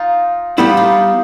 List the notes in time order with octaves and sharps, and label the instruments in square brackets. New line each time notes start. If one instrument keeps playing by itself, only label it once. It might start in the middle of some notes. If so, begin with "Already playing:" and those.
Already playing: [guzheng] D#4 F4
[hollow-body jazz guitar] G3 B3 E4 [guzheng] F4 G4
[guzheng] D#4 F4